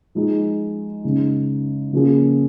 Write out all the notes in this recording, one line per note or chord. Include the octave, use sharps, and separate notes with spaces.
F3 G#3 D#4 G#4
C#3 G#3 D#4
C#3 F3 A#3 C#4 G#4